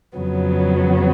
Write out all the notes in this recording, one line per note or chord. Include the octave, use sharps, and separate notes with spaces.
F2 C#3 F#3 B3